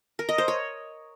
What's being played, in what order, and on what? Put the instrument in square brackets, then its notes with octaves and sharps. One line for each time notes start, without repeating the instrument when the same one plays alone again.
[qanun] A#4
D#5
C5
C#5